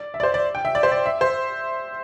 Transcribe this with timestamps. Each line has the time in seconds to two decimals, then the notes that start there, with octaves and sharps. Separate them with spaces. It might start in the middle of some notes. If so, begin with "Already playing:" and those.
Already playing: D5
0.14 E5
0.20 D5
0.23 C5
0.34 D5
0.55 G5
0.65 E5
0.75 D5
0.83 C5
0.92 D5
1.06 E5
1.21 C5